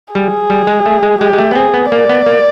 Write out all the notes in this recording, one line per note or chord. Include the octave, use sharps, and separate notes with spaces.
G3 G#4
G3
G#3
A3
G#3
G#3 G4
G#3
A3
B3
C4 G#4
B3
A#3 D5
B3
A#3